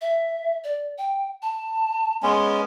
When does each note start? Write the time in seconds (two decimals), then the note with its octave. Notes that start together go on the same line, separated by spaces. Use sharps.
0.01 E5
0.64 D5
0.98 G5
1.42 A5
2.23 G#3 B3 C#4 C6